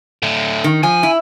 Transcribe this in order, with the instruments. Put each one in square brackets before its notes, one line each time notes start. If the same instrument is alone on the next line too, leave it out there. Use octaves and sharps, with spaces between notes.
[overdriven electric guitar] A2 D3
[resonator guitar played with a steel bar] D#3
[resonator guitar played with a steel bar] F3 [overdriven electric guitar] G#5
[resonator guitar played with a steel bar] E4